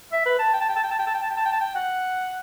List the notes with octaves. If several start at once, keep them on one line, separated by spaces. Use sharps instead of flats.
E5
B4
A5
G5
A5
G5
A5
G5
A5
G5
A5
G5
A5
G5
A5
G5
A5
G5
F#5